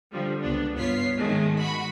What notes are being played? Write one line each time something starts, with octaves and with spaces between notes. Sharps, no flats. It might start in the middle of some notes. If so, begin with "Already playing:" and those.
D3 F3 G3
C#2 B3 D4
G2 B3 F4 C#5 B6 C7
G#2 D#3 G#3 A3
F#4 B5